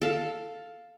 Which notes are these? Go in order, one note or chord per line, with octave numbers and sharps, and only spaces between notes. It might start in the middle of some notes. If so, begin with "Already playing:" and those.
A4 F5